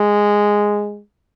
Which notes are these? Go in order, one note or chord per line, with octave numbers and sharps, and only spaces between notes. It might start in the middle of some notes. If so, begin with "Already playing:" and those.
Already playing: G#3